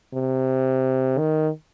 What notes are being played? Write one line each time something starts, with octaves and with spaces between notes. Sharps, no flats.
C3
D#3